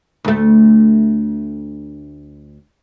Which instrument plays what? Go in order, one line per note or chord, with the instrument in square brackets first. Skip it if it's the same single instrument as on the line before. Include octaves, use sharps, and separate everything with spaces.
[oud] D2 A3